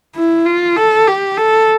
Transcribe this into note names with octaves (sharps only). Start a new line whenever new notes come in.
E4
F4
A4
G4
A4